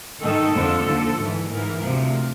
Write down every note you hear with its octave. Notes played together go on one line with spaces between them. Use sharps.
G#2 D#3 A4
F2 D3 F3
D#2 D3 F3
G#2 E3
G#2 E3 A#4
D2 C3 F3